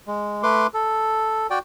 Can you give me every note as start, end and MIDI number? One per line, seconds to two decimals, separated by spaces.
0.07 0.43 56
0.43 0.67 57
0.43 0.67 71
0.43 0.67 84
0.43 0.67 86
0.74 1.47 69
1.50 1.59 66
1.50 1.59 74
1.50 1.59 79